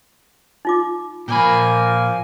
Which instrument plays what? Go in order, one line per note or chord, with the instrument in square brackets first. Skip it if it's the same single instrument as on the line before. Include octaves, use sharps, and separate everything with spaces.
[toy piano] D#4 F4 D6
[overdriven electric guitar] A#2 B5 [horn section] F3 A#3 [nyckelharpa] G#5